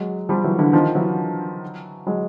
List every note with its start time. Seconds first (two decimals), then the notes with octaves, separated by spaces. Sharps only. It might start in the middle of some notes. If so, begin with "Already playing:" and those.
Already playing: F#3 G#3
0.29 F3 G3
0.44 E3 F#3
0.59 D3 E3
0.73 D#3 F3
0.95 E3 F#3
2.07 F#3 G#3